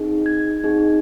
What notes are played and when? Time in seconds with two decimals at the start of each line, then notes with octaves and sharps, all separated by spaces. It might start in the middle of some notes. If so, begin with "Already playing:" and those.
Already playing: C4 D#4 G#4
0.26 G#6
0.64 C4 D#4 G#4